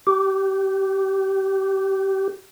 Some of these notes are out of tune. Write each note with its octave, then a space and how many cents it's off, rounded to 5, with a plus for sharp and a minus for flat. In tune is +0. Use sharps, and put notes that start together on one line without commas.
G4 -25